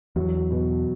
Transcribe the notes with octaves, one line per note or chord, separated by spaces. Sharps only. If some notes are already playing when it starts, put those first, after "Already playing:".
E2 F#3
B2